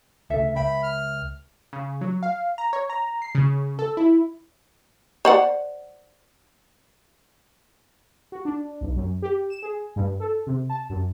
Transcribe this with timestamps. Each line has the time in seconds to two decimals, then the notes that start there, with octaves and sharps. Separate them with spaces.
0.30 D2 C#3 A4 E5
0.56 C#2 E5 G5 B5
0.83 F6
1.73 C#3
2.01 F#3
2.23 F5
2.58 A#5
2.73 C#5
2.90 A#5
3.22 C7
3.35 C#3
3.79 A4
3.97 E4
5.25 C5 D5 F#5
8.32 F#4
8.45 D4
8.81 B1
8.96 F#2
9.22 G4
9.50 E7
9.63 G#4
9.96 G2
10.20 A4
10.47 C3
10.70 A5
10.90 F#2